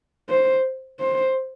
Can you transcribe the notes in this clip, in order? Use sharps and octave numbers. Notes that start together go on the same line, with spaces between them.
C5
C5